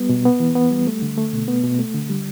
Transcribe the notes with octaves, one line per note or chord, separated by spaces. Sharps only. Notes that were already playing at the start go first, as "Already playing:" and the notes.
Already playing: G3 B3
B2
B3
E3
B3
G3
A3
D3
A3
B2
B3
B2
A3
D3
G3